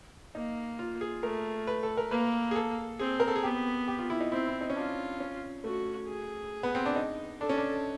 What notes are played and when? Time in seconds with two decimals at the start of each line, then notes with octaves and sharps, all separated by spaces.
0.35 A#3 D#4
0.79 F4
1.01 G#4
1.23 A3 A#4
1.67 B4
1.83 A4
1.97 A#4
2.11 A#3 B4
2.51 G#4
2.56 A4
2.99 C4 G#4
3.20 A#4
3.28 A4
3.36 G#4
3.43 B3 G4
3.88 G4
3.99 F4
4.10 E4
4.21 D#4
4.32 C4 E4
4.47 E4
4.61 D#4
4.70 C#4
4.76 D4 F4
5.20 C#4
5.64 A3 F#4
6.08 G#4
6.63 B3
6.75 C4
6.86 D4
6.96 D#4
7.41 D4 A4
7.49 C#4
7.58 D4